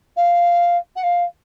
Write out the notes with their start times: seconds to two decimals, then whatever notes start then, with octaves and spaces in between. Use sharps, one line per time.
0.16 F5
0.96 F#5
1.03 F5